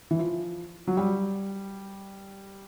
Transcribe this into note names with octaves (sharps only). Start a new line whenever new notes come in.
E3
F3
F#3
G3